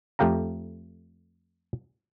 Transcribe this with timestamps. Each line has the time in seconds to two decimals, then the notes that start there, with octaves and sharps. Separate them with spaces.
0.19 F2 A3 G4 F5 A#5